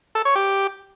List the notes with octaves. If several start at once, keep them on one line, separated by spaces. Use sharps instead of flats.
A4
C#5
G4